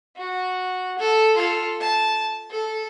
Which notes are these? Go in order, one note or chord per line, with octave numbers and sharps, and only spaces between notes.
F#4
A4
F4 A4
A5
A4